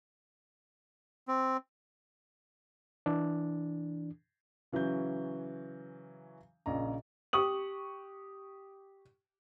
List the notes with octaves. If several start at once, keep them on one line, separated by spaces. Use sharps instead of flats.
C4
E3 D4
C#3 E3 F#3 C#4 G6
A#1 C#3 D#5 A#5
G4 C#6 D#6 F#7